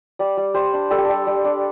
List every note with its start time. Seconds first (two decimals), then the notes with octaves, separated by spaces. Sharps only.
0.19 G3 D5
0.37 G3
0.54 G3 C5
0.73 D4
0.90 G3 A4
0.98 G4
1.05 G3 A4
1.27 G3
1.45 D4